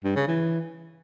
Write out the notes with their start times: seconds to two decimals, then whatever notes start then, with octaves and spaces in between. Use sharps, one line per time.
0.04 G2
0.16 C#3
0.28 E3